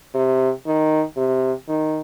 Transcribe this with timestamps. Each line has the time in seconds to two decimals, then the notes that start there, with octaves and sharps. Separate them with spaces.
0.14 C3
0.66 D#3
1.17 C3
1.69 D#3